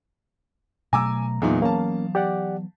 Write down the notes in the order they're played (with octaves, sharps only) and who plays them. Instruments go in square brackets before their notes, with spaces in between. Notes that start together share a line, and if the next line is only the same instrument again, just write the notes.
[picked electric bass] B2 F#3 A3 [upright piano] G#5 D6 E6 [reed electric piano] A#5
[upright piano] E2 A#2 D#4 [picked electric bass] E3 F#3 B3
[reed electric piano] A#3 C#4 [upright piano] F5 A5
[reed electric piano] G4 D5 F#5